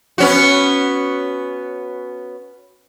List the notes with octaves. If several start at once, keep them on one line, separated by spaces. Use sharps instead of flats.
B3 C#4 F#4